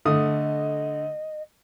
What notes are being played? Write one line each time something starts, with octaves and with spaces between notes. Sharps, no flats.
D3 A3 D#5 D#6